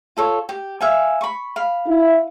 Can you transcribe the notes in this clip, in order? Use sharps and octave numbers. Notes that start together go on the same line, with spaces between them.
F4 A4 C#5
G4
E5 F5 G#5
B5 C#6
F5 B5
E4